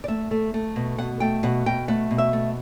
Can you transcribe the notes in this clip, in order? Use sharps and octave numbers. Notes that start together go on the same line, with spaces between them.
D5
A3 E5
A3
A3
B2
B2 F#5
A3 G5
B2 F#5
B2 G5
A3 F#5
B2
E5
A3